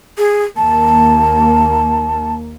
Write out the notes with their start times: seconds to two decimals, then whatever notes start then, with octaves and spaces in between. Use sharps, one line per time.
0.18 G#4
0.57 D#2 A#3 A5